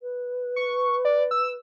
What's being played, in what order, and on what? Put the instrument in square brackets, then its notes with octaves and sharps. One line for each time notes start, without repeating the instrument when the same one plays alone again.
[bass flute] B4
[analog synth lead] C#6
D5
E6